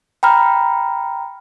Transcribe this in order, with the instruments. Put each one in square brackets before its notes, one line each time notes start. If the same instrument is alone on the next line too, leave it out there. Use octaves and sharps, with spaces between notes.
[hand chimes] G5 A#5 B5 F6